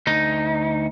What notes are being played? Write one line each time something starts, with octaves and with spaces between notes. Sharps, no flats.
D2 D#4